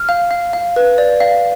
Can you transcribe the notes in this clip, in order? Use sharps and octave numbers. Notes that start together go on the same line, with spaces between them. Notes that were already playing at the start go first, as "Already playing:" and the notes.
Already playing: F6
F5
F5
F5
B4
D5
F5